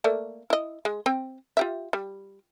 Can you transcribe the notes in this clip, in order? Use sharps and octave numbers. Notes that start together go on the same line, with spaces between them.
A3 A#3 D5
E4 D#5
G#3
C4 G5
F4 G4 E5
G3